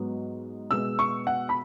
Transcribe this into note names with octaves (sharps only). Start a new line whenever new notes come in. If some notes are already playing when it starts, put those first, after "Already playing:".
Already playing: G#2 F#3 B3
B2 G#3 B3 E6
C#6
F#5
B5